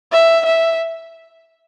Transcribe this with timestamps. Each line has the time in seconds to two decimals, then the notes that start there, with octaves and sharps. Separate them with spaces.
0.13 E5
0.46 E5